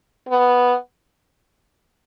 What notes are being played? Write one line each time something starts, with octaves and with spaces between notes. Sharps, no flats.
B3